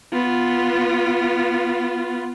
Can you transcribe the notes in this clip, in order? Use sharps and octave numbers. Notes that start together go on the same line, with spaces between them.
B3 F4